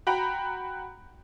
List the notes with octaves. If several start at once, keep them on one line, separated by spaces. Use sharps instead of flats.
F#4 G5 A#5 B5